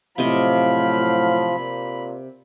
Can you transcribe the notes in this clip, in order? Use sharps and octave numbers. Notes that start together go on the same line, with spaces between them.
A2 C3 F3 F#3 D#5 F5 B5
A#2